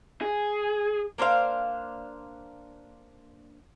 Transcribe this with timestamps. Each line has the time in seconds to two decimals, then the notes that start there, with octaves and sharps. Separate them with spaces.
0.21 G#4
1.18 A#3 D4 C5 F5